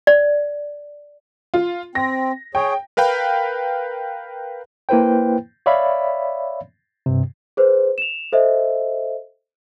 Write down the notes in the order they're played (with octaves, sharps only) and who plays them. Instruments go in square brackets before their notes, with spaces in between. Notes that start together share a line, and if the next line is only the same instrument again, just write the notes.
[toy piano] D5
[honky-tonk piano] F4
[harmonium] C4 [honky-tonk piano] A#6
[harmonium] G#4 C#5 [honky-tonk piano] G5
[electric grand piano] A#4 B4 F5 G5 B5
[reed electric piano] A#3 E4 B4 C5 G5
C#5 D5 E5 F5 B5
G2 C3
[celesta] G#4 B4 C5
E7 F7
A4 C5 D#5 E5